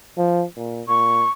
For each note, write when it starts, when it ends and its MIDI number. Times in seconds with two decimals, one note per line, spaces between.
0.18 0.44 53
0.57 0.82 46
0.88 1.25 46
0.88 1.31 85